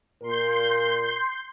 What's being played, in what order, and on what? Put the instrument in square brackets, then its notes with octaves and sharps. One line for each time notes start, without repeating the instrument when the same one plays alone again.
[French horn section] A#2 A#4 [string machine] C6 G6